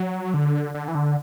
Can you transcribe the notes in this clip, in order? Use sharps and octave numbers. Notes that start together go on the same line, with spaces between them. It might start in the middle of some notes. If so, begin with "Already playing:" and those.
Already playing: F#3
D3
D3
E3
D3